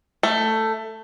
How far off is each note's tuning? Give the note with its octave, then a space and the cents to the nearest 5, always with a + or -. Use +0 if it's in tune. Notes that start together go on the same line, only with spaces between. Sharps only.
A3 +10